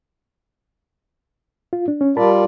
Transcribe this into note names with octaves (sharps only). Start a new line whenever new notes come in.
F4
D4
C#4
G3 F4 A#4 D5 A5 B5